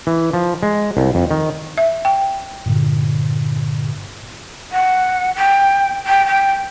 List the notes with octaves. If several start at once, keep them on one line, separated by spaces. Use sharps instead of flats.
E3
F3
G#3
C2
F2
D#3
E5
G5
G2 A#2 D3
F#5
G5
G5
G5